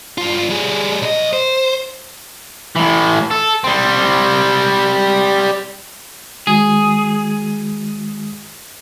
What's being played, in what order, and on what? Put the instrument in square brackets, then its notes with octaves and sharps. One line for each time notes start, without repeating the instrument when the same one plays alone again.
[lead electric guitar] G2 F4
G3 G#4
B1 D#5
C5
[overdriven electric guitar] A2 E3
A4
G3 C4
[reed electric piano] D#3 G#3 F#4 [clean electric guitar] G#4